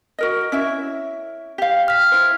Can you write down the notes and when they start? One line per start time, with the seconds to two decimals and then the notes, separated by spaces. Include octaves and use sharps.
0.19 F#4 A#4 D#5
0.52 C#4 E4 E5
1.58 G4 F5
1.88 F6 B6
2.12 E4 C5